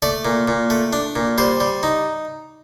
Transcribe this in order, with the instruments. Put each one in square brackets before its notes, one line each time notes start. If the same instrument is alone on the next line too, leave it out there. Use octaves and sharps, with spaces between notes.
[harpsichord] A3 D5
A#2
A#2
A3
D4
A#2
G3 C5
G3
D#4